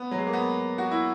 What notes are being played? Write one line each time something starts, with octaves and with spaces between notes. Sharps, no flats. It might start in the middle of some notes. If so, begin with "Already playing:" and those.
Already playing: B3
F#3
G#3
A#3
B3
F#4
E4